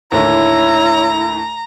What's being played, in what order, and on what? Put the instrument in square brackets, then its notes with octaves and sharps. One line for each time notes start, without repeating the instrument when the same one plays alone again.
[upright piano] D#2 A2 D3 [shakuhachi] E4 [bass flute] C#5 [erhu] A#5